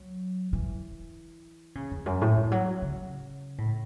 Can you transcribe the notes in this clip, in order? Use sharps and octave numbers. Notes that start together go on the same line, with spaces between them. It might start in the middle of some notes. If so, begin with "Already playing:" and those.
Already playing: F#3
E3
C#3
E2
F#2
A2
E3
F#3
C#3
A2